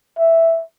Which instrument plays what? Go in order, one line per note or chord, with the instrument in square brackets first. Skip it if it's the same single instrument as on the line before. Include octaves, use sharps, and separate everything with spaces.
[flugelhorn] E5